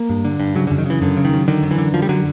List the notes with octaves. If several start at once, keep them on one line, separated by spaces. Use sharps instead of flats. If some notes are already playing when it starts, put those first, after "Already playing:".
Already playing: A#3
G2
D3
G2
C#3 F#3
D3
F#2
D#3
C#3 E3
F#2 D3
C#3
D#3
F#2
D3 D#3
F#2
E3
D3
F#2 F3
G3
D3 F#3